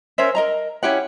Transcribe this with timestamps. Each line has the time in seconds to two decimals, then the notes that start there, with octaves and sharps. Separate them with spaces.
0.18 C#4 A#4 C5 E5
0.35 A#4 D#5 A#5
0.83 C#4 E4 G4 F#5